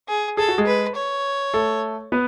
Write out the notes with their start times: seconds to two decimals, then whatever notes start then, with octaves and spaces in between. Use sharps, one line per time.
0.08 G#4
0.37 G#4 A4
0.48 F#4
0.58 G#3 G#4
0.67 B4
0.96 C#5
1.54 A3 A4
2.12 B3 B4